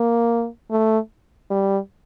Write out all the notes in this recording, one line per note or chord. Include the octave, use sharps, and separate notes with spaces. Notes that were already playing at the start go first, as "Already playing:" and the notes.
Already playing: A#3
A3
G3